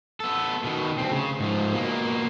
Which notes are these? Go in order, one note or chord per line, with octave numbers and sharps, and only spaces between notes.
B3 A4
B2 D#3
D2 C4
C#3
G#2 F3
B2 A#3